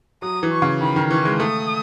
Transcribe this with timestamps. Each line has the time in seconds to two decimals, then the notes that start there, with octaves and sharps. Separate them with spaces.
0.22 F#3 D#6
0.43 E3
0.52 C#6
0.62 C#3
0.81 D#3 B5
0.96 D#3
1.10 E3 C#6
1.25 G#3
1.40 A3 D#6